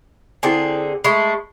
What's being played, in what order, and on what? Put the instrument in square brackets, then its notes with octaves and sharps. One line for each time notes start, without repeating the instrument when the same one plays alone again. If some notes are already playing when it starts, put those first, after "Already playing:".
[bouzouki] D3 C4 G#4 [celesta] E4 G5 G#5
[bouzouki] G#3 A3 [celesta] B5 C#6